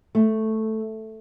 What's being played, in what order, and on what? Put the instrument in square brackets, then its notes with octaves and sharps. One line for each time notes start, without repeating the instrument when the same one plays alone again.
[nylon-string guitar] A3